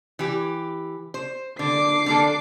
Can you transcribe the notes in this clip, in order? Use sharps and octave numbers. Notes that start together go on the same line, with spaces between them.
E3 G4
C5
D3 D6 C7
D3 A#3 A4